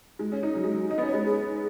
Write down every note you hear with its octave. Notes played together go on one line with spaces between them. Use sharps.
G#3
C#4
D#4
F#3
G#3
F#3
D#4 D#5
B3
C#4
C#5
G#3
G#4